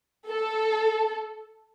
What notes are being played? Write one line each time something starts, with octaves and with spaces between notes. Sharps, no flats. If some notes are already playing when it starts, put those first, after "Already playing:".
A4